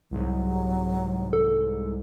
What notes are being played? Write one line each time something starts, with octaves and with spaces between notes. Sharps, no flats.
C2 G#2 F#3
A4